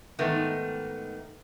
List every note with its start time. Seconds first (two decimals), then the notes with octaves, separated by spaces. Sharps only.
0.19 G#2 D#3 A3 B3 D#4